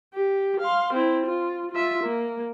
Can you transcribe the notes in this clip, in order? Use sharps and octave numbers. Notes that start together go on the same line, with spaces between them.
G4
F5 C6
C4 E4
F4
F4 E5
A#3